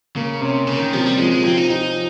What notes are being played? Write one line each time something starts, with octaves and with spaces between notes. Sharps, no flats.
C#3 A#3
C3 C#4
C#3 A#3
D#3
C3 F3
G3
F3 G#3
G#3
F3 C4
D#4
F3 D#4